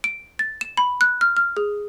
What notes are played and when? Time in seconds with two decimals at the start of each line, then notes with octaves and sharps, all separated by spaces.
0.04 D7
0.39 A6
0.61 E7
0.77 B5
1.01 F#6
1.21 F6
1.37 F6
1.57 G#4